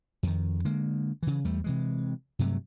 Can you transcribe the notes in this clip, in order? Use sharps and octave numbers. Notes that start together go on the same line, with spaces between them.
F2 D#3
D3 G#3 A#3
C#3 E3
E2 G3 A3
C3 E3 G#3
G2 C3 F#3 A3